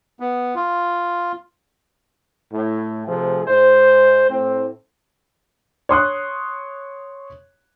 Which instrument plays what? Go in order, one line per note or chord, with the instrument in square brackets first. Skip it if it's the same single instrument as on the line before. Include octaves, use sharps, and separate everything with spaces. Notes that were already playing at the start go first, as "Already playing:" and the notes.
[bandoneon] B3
F4
[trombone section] A2
C3 F3 A3 G#4
G#2 C5
A2 C4
[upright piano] C#5 C6 D#6 F#6